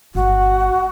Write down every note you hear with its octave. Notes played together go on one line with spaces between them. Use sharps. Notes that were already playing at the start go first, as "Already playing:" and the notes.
G1 F#4